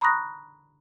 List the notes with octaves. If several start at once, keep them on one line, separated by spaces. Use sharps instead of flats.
A#5 B5 C#6 D#6 F#6 A#6